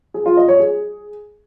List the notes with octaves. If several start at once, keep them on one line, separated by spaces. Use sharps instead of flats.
G#4
F4
D#5
C#5
G#4